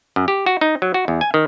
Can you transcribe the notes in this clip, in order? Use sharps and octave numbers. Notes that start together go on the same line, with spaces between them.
F#2
G4
F#4
D#4
F#3
F#4
E2
G#5
D#3